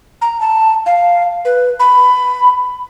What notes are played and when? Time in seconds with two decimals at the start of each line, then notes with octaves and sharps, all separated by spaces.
0.21 A#5
0.40 A5
0.86 F5
1.45 B4
1.79 B5